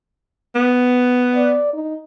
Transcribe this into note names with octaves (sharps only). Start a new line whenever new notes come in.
B3
D5
D#4